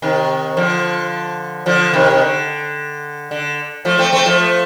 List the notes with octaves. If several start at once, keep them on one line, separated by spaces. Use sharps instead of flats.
C3 D#3
D3 F3
D3 F3
C3 D#3
D#3
D3
D3
F3 A3
A3 C4
A3 C4
F3 A3